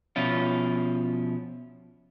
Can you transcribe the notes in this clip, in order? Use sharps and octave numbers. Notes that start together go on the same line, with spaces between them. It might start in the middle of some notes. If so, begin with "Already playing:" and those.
B2 F3 C#4 E4 F4